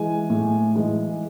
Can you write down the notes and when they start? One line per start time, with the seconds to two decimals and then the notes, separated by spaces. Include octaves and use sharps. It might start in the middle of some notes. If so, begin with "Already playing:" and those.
Already playing: E3 G#3 G#5
0.30 A2
0.75 E3 G#3